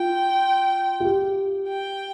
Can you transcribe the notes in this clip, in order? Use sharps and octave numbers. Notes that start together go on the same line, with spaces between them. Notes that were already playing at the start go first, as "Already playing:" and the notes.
Already playing: F4 G5
F4
G4
G5